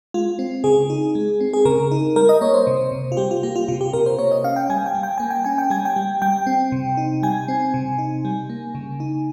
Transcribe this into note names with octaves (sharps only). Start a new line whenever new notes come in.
G#3 F4
C4
C#3 G#4
D#4
G#3
C4
G#4
C#3 A#4
D#4
G3 A#4
D#5
A#3 C#5
C5
C3
C3
F4
G3 G4
F4
A#3 G4
F4
C3 F4
G4
C3 A#4
C5
A#3 C#5
D#5
C#4 F5
G5
G3 G#5
G5
G3
G5
A#3 G#5
G5
C#4 G#5
G5
G3 G#5
G5
G3
G3 G5
C4
C3
D#4
G3 G#5
C4
C3
D#4
G3
A#3
C#3
D#4